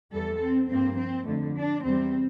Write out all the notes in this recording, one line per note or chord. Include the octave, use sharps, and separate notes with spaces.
E2 E3 G3 A4
C4
G2 F3 A#3 C4
C4
F2 D3 A3
D4
E2 C3 G3 C4